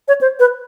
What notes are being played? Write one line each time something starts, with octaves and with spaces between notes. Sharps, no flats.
C#5
C5
B4